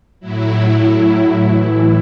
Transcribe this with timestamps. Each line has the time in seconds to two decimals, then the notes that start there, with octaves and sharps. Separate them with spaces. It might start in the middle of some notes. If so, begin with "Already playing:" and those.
0.20 A2 F#3 E4
1.41 A2 E3